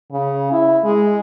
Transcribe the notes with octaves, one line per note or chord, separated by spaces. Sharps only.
C#3
E4
G#3